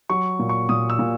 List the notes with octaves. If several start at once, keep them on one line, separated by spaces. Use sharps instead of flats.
F#3 C#6
A#2
C#6
A#2 D#6
E6
A#2